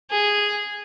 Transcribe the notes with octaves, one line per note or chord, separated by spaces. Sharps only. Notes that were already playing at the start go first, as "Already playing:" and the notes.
G#4